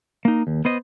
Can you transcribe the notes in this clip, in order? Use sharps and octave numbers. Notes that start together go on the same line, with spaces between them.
A#3 D#4
D#2
B3 C5 D#5